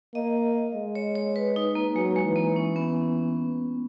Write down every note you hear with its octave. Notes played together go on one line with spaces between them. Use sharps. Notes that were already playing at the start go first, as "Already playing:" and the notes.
A#3 D#5
G#3
C#5
C#5
B4
D#4
A#3
F#3 G#3
G#3
E3
A#3
C#4
B3